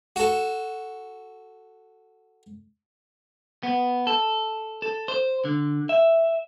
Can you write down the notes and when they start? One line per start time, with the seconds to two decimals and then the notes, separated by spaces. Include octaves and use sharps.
0.16 F#4 A4
3.63 B3
4.07 A4
4.82 A4
5.08 C5
5.45 D3
5.89 E5